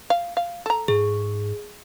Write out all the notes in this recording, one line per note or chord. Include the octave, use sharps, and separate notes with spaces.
F5
F5
A4 A#5
G#2 G#4